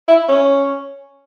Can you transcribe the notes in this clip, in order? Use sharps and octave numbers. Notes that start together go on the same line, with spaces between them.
E4
C#4